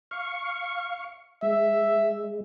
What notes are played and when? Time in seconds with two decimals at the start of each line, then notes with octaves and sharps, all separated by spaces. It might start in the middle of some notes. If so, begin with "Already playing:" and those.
0.11 F5 C#6
1.42 G#3 E5